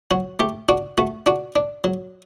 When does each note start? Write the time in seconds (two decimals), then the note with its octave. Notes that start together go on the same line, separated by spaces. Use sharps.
0.11 F#3 F#4
0.39 A3 G4
0.69 D4 F#4
0.98 A3 F#4
1.26 D4 F#4
1.56 D4
1.84 F#3